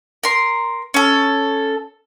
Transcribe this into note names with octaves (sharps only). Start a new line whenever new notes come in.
A#4 C6
C#4 A4